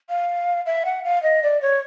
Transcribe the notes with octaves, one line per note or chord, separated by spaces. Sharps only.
F5
E5
F#5
F5
D#5
D5
C#5